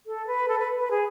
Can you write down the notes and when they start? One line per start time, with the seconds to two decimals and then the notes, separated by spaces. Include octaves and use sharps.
0.06 A4
0.27 B4
0.48 A4
0.59 B4
0.79 B4
0.91 G#4